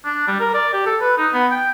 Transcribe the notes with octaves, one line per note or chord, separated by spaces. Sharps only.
D4
G3
A#4
D5
G4
A4
B4
D#4
B3
G5